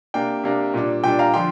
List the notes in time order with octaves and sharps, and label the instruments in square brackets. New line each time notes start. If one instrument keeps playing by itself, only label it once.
[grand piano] C3 A#3 D4 G5
C3 A#3 D4
A#2 G3 D4
A#2 G3 D4 G5
F5 A#5
D3 F3 G5 C6